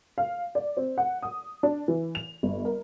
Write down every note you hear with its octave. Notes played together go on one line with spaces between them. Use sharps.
F5
D5
C4
F#5
D#6
D4
E3
F7
G1
A#4